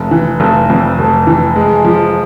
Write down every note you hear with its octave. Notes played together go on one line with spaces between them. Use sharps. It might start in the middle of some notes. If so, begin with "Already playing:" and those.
Already playing: F1
E3
F1
F2
F1
E3
G#3
F3